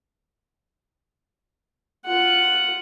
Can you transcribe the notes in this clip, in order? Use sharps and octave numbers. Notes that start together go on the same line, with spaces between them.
F4 F#5